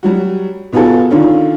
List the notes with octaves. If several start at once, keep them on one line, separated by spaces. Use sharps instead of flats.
F#3 G3 F#4
B2 B3 F4 F#4 G#4 A4
D3 D#3 C#4 D4 F4